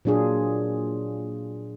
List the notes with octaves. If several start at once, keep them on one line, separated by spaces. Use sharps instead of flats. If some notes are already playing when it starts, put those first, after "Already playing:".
A#2 F#3 D4 F4 G#4